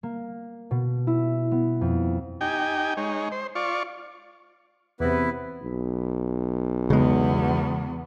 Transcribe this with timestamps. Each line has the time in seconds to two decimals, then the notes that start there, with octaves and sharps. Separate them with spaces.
0.03 A#3
0.71 B2
1.07 E4
1.52 B3
1.81 F2
2.41 D#4 G4 G5 G#5
2.97 G#3 D#4 C#5
3.32 C5
3.55 F4 D5 C#6
5.00 E2 C3 B3 E4 B4
5.62 B1
6.90 E2 C#3 G#3 B3